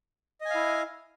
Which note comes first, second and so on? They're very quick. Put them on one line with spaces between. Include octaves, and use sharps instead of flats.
D#5 G#5 F5 E4